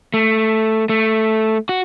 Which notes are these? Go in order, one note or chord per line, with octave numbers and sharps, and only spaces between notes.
A3
A3
F#4